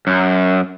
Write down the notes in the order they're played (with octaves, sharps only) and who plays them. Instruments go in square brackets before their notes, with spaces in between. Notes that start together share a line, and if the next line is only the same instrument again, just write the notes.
[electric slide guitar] F#2